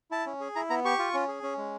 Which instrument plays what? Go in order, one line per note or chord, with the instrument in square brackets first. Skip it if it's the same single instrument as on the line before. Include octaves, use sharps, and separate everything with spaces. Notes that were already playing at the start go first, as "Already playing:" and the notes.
[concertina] E4 A5
C#4
G#4
E4 A#5
B3 A#5
G4 C#6
F4
C#4
G#4
C#4
G#3